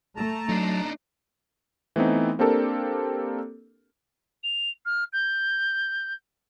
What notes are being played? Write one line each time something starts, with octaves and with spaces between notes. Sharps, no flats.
A3 A5 A#5
F#3 D4 D#4
E3 A3 B3 C4 D#4
A#3 C4 D4 G4 A4 A#4
F7
F6
G6